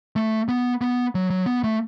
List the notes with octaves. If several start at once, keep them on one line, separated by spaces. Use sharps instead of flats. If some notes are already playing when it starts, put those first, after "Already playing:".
A3
B3
B3
F#3
F#3
B3
A3